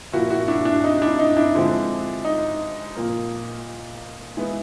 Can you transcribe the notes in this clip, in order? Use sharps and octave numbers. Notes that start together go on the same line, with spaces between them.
A#2 F3 A#3 E4 F#4
E4 F#4
D4 E4
D4
D#4
D4 E4
D#4
D4 E4
D3 F3 G#3 C4
D#4
A#2 F3 A#3
E3 G#3 B3